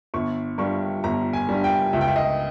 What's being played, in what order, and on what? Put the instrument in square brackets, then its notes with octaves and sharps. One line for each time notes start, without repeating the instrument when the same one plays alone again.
[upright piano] G1 C#6
G2 G3 C#6
G1 A#5
G#5
G2 G3
G5
C#2 E5
G5
E5
D#5